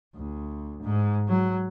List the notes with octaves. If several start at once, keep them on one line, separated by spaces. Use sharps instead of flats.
D2
G#2
F#3